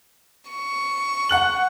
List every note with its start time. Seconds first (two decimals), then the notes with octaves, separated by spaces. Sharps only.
0.51 C#6
1.29 F#5 F#6 F#7